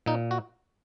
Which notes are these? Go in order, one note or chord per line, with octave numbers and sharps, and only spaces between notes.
A#2 D#4
F#4